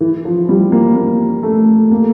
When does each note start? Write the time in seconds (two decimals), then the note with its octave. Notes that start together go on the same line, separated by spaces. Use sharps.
0.01 E3
0.25 F3
0.49 G3
0.72 A#3
0.96 A#3
1.43 A3
1.92 A#3